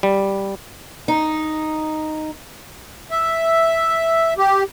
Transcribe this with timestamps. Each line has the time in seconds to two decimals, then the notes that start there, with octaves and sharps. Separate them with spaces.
0.03 G3
1.08 D#4
3.11 E5
4.38 G4